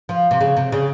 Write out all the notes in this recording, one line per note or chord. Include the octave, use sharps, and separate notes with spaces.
F3
C3
C#3
C3
C#3